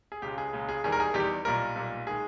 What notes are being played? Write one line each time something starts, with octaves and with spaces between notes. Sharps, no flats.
G#4
C#2 C#3 G#3 G4
G#4
C#2 C#3 G#3
G#4
E2 D#3 G3 G#4
A#4
G#4
E2 D#3 G3 G4
B1 A#2 G3 A#4
B1 A#2 G3
D#3 G#3 G#4